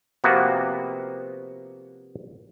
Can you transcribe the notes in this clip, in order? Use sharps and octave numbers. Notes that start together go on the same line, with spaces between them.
C3 F3 A#3 B3 F#4